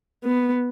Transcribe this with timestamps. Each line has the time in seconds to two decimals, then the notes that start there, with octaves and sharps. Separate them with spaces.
0.24 B3